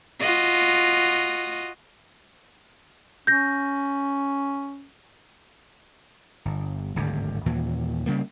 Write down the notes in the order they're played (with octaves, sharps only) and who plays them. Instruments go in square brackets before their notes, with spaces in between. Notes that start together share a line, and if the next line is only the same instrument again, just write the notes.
[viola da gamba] F4 F#4 D#5
[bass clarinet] C#4 [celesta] G6 A#6
[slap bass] G1
D1 G#1 G2 D3
D#2 A#2 E3
C#3 G3 A#3